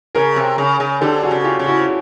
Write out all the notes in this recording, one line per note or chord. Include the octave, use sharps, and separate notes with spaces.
C#3 G#4 A#4
C3
C#3
C#3
D3 G4 A4
F#4 G#4
C#3
F4 G4
C#3
E4 F#4